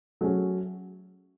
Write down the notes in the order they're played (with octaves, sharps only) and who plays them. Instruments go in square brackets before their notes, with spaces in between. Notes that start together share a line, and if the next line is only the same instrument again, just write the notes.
[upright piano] F#3 A3 C#4 G#4